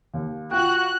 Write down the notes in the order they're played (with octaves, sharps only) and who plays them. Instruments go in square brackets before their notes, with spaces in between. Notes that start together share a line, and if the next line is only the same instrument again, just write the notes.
[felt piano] D#2
[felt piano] F4 G5 [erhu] F#4 [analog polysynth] F#6